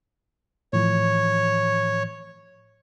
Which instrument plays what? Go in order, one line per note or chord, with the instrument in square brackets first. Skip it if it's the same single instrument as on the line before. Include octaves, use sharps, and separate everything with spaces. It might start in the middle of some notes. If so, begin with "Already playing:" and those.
[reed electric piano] A2 E3 F3 [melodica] C#5